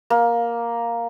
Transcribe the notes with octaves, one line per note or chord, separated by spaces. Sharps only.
A#3